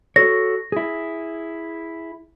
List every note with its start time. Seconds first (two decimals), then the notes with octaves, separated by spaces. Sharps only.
0.16 F#4 A4 C#5 A#6
0.72 E4 G#4